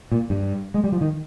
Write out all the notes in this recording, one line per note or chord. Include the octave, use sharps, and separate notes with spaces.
A#2
G2
G#3
G3
F3
D#3